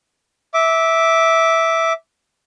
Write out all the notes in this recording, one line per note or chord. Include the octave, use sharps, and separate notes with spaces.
E5 D6